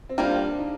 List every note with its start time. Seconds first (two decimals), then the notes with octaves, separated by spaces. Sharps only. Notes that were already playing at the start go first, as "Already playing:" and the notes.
0.09 C4
0.18 G3 A#3 D4 F4 C5
0.59 D#4